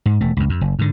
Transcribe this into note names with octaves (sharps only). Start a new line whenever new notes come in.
G#2
E1 A3
C#2 F#2
F2
F#1
G#2 D3